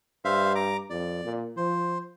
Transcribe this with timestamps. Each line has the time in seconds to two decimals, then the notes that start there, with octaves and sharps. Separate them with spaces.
0.25 G2 C5 E5 F5
0.55 A#5 D6
0.90 F2 D5
1.25 A#2
1.57 F3 C5